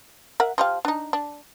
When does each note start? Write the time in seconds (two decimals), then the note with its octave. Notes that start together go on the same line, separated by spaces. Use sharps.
0.40 A#4 E5 F#5
0.58 F3 G4 F5
0.85 D4 D#4
1.13 D4